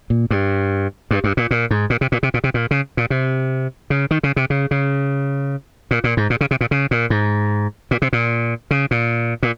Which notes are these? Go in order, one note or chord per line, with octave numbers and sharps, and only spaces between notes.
A#2
G2
G2
G2
A#2
A#2
G#2
A#2
C3
A#2
C3
A#2
C3
A#2
C#3
A#2
C3
C#3
D#3
C#3
C3
C#3
C#3
A#2
A#2
G#2
A#2
C#3
C3
A#2
C#3
A#2
G#2
A#2
C3
A#2
C#3
A#2
A#2